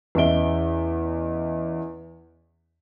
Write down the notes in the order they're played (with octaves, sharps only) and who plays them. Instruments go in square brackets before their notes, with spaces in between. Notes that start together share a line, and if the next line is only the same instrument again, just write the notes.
[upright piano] E2 C#4 D#5 E5 D7 G7